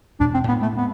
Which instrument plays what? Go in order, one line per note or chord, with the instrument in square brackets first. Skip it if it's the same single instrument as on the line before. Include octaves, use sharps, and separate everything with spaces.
[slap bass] E2 B2 G#3 [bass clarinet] D4
[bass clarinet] C4
[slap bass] A2 G#3 C4 [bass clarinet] B3
[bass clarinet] A3
[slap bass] G#3 C4 [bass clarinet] B3